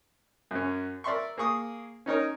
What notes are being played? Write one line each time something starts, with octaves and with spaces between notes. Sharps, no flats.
F#2 C#4
A#4 D5 E5 C6 C#6
A#3 G#4 C#6 D#6
C#4 D#4 A#4 C#5